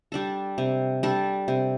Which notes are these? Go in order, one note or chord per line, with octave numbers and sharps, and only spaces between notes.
G3 D4 A4
C3
G3 D4 A4
C3